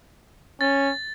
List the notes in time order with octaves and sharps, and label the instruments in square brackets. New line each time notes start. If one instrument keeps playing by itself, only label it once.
[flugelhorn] C#4 [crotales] A6